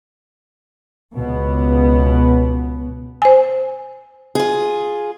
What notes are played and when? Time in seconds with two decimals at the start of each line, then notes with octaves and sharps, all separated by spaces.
1.15 C#2 B2 B3
3.22 C5 G#5
4.35 F4 G#4